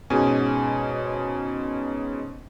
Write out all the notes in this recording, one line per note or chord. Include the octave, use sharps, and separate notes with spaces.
G#2 B2 C#4 G#4 G#5